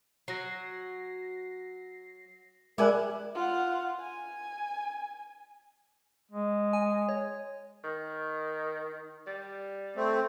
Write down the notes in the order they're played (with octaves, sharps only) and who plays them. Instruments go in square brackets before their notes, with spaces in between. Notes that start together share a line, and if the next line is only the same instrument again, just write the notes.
[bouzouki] F#3 [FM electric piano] A#6 C7
[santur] G3 G#5 D6 [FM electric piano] G#3 F#6 [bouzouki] E4 [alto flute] A#4
[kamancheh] F4 F#5
G#5
[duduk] G#3
[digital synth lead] G#5
C#5
[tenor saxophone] D#3
G3
[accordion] A3 C4